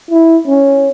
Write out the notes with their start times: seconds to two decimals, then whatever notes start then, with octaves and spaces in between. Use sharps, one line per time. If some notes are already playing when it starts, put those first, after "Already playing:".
0.11 E4
0.47 C#4